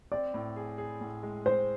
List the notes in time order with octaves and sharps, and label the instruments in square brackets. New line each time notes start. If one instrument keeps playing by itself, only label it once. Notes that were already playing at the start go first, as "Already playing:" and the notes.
[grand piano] C4 [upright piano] D5
[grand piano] A2
G#4
G#4
A2
G#3
[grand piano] G#3 [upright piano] C5